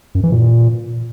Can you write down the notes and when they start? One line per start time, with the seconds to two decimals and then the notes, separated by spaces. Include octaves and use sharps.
0.15 F#2
0.23 E3
0.32 A#2